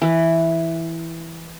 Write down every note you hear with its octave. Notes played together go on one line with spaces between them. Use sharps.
E3 B4